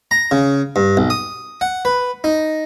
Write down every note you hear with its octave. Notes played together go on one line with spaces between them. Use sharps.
A#5
C#3
G2
B1
D#6
F#5
B4
D#4